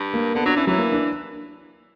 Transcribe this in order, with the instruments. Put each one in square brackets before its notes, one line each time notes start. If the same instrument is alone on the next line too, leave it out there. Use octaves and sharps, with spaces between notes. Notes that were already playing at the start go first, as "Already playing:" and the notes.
Already playing: [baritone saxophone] G2
[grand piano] A#3
[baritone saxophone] D3 [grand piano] B3
[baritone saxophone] F#3 [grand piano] D4
[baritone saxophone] E3 [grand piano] C#4
[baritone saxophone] E3 [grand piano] F#3
[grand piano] A#3
D4